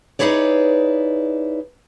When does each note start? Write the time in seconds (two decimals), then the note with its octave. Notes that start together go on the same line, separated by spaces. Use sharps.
0.19 D#4 E4 G#4 B4 C#5 D5